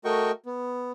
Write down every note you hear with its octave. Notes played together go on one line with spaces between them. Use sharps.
A3 F#4 A#4 D#5 G5 C#6
B3